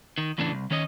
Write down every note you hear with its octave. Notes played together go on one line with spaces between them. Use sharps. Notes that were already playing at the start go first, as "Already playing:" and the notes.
D#3
E2 A2 C#3 E3 D4
C2
D#3 C#4 C#5 D#5